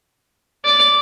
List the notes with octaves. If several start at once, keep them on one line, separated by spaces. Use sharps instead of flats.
D5